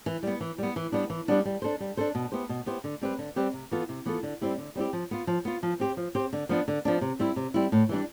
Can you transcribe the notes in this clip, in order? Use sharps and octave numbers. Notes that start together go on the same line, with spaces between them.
E3
G3 B3
E3
G3 B3
E3
G3 B3 D4
E3
G3 B3 D4
G3
D4 A4 C5
G3
D4 A4 C5
B2
B3 E4 G4 C5
B2
B3 E4 G4 C5
D3
G3 C4 G4 B4
D3
G3 C4 G4 B4
C3
E3 B3 F4 A4
C3
E3 B3 F4 A4
D3
G3 C4 E4 G4
D3
G3 C4 E4 G4
F3
B3 F4
F3
B3 F4
F3
C4 G4 C5
F3
C4 G4 C5
D3
F3 B3 D4
D3
F3 B3 D4
C3
G3 C4 E4
C3
G3 C4 E4
A2
E3 G3 D4